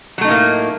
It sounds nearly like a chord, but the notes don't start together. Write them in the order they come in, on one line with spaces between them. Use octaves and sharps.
F#3 A3 D#4 A2 A#3